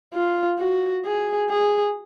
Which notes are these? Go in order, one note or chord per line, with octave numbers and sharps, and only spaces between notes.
F4
F#4
G#4
G#4